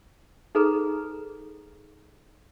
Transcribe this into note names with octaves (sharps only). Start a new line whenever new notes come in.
D#4 G#4 A4 B4 A#5